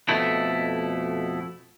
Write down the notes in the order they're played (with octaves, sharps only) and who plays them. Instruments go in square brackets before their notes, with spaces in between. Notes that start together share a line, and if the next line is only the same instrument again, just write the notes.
[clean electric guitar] F2 B2 A3 E4